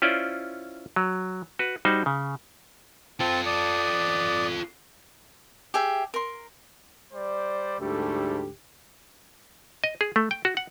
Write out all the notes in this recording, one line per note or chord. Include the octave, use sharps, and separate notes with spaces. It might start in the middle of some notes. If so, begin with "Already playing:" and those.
C#4 E4 F4 C5 D5
F#3
F#4 B4
G3 D#4 F#4 C5
C#3
C4 F4 A4 A5
D5 D#6
G4 G#4 E5
A#4 C6
G3 C5 D5
D2 G#2 G3 A3 G4 A4
D#5
G#4
A3
G5
F#4
F#5